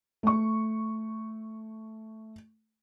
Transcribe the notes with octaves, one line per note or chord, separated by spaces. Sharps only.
A3 C#6